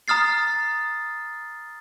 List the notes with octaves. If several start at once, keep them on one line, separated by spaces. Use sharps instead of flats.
A#5 D#6 F6 A6 C7